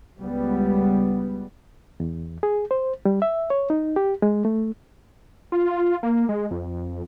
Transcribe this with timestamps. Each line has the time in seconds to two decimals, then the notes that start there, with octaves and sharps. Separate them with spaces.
0.21 C#2 G3 B3
2.00 E2
2.43 G#4
2.71 C5
3.05 G3
3.22 E5
3.50 C#5
3.70 D#4
3.96 G4
4.22 G#3
4.45 A3
5.52 F4
6.03 A#3
6.29 G#3
6.51 F2